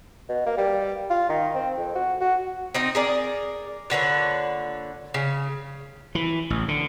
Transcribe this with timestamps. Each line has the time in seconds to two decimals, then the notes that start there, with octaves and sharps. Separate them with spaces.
0.29 B2
0.46 A#3
0.58 G3
1.10 F4
1.29 D#3
1.55 C4
1.77 F2
1.95 F#4
2.21 F#4
2.75 C4 D#4 D#5
2.95 G#4 A#4 D5
3.90 A#2 D3 B4 C#5
5.14 C#3
6.15 E3
6.50 A1
6.68 D3